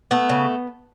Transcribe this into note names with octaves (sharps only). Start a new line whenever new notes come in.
A3 B3
C#3